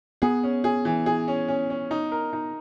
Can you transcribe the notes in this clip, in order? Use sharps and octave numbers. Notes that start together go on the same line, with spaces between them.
B3 G#4
C#4
G#4
E3
G#4
C#4
C#4
C#4
D#4
A#4
D#4